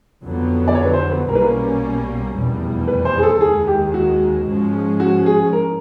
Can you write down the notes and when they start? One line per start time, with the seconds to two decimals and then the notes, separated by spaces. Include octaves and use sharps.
0.23 F2 D3 F#3 B3
0.68 D5
0.75 C#5
0.85 B4
0.94 C5
1.12 B4
1.29 B1 B2 G3 A#3 C#4 A#4
1.35 B4
1.44 A#4
2.34 F1 E2 B2 G3
2.88 B4
3.05 C5
3.18 G#4
3.23 A4
3.41 D#2 D#3 G#3 G#4
3.67 G4
3.94 F#4
4.47 G#2 F3 G#3 C#4
5.00 F#4
5.26 G#4
5.53 A#4